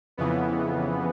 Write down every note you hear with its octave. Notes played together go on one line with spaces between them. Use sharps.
F2 C#3 E3 B3